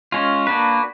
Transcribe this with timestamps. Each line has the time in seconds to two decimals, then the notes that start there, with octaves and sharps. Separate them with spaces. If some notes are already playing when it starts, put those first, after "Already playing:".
0.12 G#3 C#4 F4
0.47 A#3 D4 F#4 B4